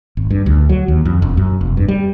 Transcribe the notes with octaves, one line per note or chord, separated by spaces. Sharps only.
G#1
G2
D2
F#3
D#2
F2
E1
F#2
F1
G2
G3